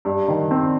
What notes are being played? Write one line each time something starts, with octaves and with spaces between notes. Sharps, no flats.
G2
D#3
C4